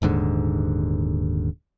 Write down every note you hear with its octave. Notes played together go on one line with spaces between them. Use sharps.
D#1 D#2 G#2 D3